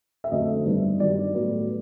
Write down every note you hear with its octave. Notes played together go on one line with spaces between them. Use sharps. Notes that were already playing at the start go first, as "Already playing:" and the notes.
E5
F2 D3 F#3 A3 C4 D#5
G2 D#3 G3 B3
G2 D#3 F#3 D5
A2 F#3 B3